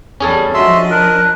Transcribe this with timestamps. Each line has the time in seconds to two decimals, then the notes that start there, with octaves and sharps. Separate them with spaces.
0.20 E2 G3 C#4 G#4 A4
0.54 F3 D4 F#4 D#5 E5 C6
0.91 A#4 A5 F#6